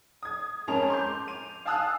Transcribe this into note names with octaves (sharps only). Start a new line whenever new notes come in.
D#6 G#6
F2 G#2 C#4 A#4 A5 F7
C6 D6 G6
D#7 F7
F5 G#5 A5 D#6 E6 F#6